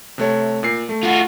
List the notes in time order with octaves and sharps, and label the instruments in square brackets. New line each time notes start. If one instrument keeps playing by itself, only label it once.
[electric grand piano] C3 A3 C#5
A#2 C7
A3
[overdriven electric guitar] F4 F#4